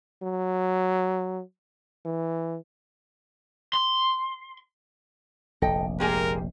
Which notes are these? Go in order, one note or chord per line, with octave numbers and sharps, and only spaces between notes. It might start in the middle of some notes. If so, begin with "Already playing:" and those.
F#3
E3
C6
F1 A#1 A4 D#5 G5
G#3 A#3 G4 G#4 A#4